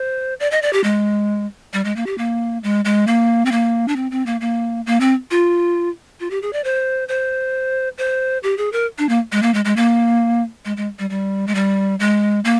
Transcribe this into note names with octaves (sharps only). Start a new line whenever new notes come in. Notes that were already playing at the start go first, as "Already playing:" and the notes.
Already playing: C5
D5
D#5
D5
G4
G#3
G3
G#3
A#3
G4
A#3
G#3
G#3
A#3
C4
A#3
D4
C4
C4
A#3
A#3
A#3
C4
F4
F4
G4
G#4
D5
C5
C5
C5
G4
G#4
A#4
D4
A#3
G#3
A#3
G#3
G#3
A#3
G#3
G#3
G3
G3
G#3
G3
G#3
A#3